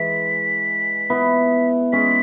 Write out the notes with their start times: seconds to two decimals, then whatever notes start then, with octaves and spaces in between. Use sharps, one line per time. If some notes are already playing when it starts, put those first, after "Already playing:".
Already playing: E3 G#3 B6
1.10 B3 E4
1.93 G#3 C#4 B6